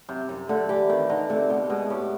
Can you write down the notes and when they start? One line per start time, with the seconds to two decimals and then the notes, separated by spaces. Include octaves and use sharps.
0.09 F#2 C3
0.29 F#2 C3
0.49 D3 A3
0.69 E3 G4
0.90 D#3 C4
1.09 D3 D#4
1.30 C3 A3
1.49 B2 G4
1.70 B2 G#3
1.90 A2 G4